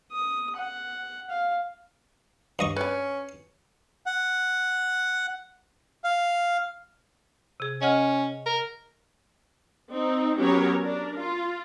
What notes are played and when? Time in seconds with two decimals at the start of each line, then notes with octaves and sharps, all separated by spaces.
0.12 D#6
0.56 F#5
1.30 F5
2.59 G2 D#5 C#6
2.76 C#4 B4 D5
4.06 F#5
6.04 F5
7.60 C3 G#4
7.82 C#4 D#5 F#5 F6
8.46 A#4
9.92 C4 D#4
10.40 F#3 B3 C#4 G4 A#4 C#5
10.82 D4 A#4
11.17 F4